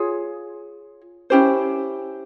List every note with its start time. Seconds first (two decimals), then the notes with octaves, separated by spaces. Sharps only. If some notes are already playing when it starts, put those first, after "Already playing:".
Already playing: F4 G#4 C#5
1.30 C#4 E4 G4 C5